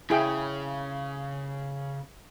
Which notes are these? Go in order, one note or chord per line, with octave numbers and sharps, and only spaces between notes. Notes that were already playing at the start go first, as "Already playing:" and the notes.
C#3 E4 G#4 G5